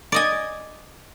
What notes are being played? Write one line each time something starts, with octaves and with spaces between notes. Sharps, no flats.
D5 D#5 G#5